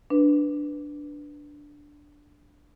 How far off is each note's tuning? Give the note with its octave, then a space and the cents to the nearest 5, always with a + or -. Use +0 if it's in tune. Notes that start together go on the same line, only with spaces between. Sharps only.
D4 +0 B4 +0